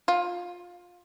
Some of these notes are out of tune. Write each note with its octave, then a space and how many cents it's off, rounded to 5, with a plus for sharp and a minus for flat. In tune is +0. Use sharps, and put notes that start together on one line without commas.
F4 +20